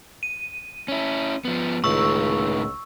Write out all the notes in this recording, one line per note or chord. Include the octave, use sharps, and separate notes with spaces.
D#7
C#4 E4
F3 B3
C#2 A2 D#3 C#6 E6